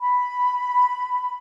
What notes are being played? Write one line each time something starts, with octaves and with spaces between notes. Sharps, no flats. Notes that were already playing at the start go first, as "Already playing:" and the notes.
B5